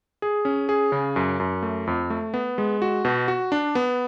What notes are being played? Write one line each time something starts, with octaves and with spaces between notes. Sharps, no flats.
G#4
C#4
G#4
C#3
F#2
F#2
A3
F2
A3
B3
G#3
F#4
B2
F#4
D4
B3